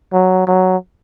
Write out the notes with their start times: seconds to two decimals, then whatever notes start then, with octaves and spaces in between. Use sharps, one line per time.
0.13 F#3
0.47 F#3